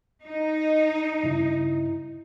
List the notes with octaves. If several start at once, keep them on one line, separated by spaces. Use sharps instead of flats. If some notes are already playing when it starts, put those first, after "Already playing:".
D#4
G2 C#3 E4